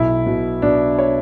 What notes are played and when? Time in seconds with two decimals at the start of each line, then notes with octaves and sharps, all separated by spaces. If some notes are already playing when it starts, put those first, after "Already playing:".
Already playing: B1 E4
0.26 B2
0.62 B2 D4
0.99 C#5